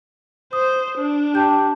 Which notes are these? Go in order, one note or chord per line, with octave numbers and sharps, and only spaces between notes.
C5 D#6
D4
G4 A5 G6